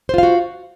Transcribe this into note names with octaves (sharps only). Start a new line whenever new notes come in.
F4 F#4 C5 F5